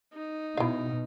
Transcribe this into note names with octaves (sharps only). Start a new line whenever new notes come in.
D#4
B2 E4 F5